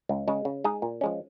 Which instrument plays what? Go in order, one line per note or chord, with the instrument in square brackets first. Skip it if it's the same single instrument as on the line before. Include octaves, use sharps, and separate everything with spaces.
[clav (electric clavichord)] C#2
C#3 G#3
C#3
G#3 D#4 G#4
A#2
F3 G#3 C#4